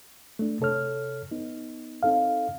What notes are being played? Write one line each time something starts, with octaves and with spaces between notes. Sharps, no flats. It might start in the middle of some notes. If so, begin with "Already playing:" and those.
A3 D4
C3 A4 C#5 F6
B3 D#4
C4 D#4 A4 F5